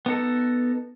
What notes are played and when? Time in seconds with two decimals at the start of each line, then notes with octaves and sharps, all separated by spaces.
0.06 B3 D#4 A4